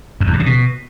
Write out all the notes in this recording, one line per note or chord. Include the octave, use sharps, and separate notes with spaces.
F#2
E2
G2
C#3
B2